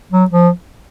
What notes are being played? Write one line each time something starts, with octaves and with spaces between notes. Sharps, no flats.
F#3
F3